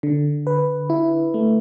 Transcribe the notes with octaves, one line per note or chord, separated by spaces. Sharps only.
D3
B4
E4
A3